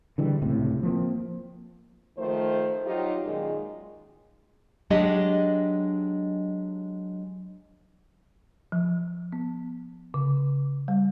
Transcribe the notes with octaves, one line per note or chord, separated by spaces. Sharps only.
D3 E3 G3 G#3
C#2 A2 C3
F3 A#3 C4
D#3 F3 A3 C5
F#3 D#4 F4 G4
F#2 A#2 D#3 G#3
F#3 G#3 D4 G4 D#5
F3
B3
C#3
G3